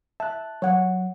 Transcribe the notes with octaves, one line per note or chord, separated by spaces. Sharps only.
E5 A5 F#6
F#3 C#5 F#5